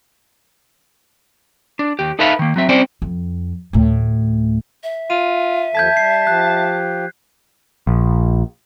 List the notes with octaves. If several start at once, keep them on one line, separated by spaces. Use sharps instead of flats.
D4
D#2 G4
D#4 A4 B4 E5 F5 B5
D#3 A#3
F#3 C4 E5
G3 C4 C#4 C5 D5
F2
D2 A2
E5
F4 D#7
D#2 F3 A4 A5 G6 G#6 B6
G3 C7
F3 G4 F#6
A#1